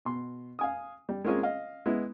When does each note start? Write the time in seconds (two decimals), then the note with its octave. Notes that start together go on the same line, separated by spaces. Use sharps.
0.05 B2 C6
0.59 F5 G#5 D#6
1.09 G3
1.24 G#3 A#3 C4 C#4 F4 G#4
1.43 D#5 F5
1.86 G#3 B3 E4